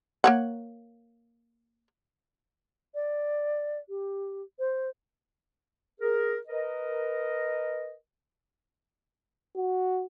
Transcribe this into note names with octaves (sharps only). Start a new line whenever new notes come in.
A#3 C#5 F#5
D5
G4
C5
G#4 A#4
A#4 B4 D#5
F#4